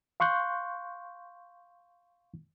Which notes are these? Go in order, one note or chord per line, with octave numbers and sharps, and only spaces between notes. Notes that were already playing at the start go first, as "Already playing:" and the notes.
F5 C6 C#6 F#6 G6